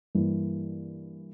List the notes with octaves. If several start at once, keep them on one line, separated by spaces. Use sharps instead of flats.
G2 E3 A#3